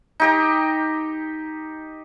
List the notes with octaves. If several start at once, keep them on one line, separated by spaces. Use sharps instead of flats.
D#4 G4 A#5